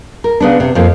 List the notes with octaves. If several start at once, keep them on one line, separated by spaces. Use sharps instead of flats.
A#4
C#3 B3 D4
C3
F2 F3 A#3